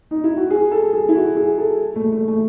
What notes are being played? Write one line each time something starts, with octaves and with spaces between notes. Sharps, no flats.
D#4
E4
F#4
G#4
A4
G#4
E4
F#4
G#4
A4
A3
A3
A3